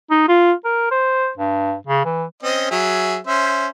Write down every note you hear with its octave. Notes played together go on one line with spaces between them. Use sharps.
D#4
F4
A#4
C5
G2
C#3
E3
C4 C#4 D#5
F#3 G#4 E5
C#4 C5 E5